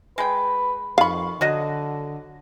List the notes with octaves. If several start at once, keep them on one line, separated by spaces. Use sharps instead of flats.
G#3 B4 G5
F2 D#3 F5 B5 C#6
D3 F#3 F#4 D#5